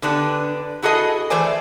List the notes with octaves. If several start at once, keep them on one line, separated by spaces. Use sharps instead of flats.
D3 B3 D4 G4
E4 F#4 G#4 A4 D#5
E3 A3 C5 D5 G#5